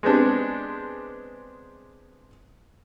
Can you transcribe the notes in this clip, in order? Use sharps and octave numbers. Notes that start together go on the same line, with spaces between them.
G#3 B3 C4 D4 G4